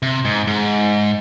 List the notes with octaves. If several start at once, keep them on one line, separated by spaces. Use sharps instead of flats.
C3
G#2
G#2